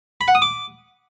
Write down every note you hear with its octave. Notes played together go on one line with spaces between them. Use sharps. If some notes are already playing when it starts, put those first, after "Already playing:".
B5
F#5
D#6
D6